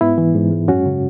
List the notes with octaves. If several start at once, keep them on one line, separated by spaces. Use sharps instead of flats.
G#2 B3 E4
E3
G#2
G#3
F#2 C#4 F#4
C#3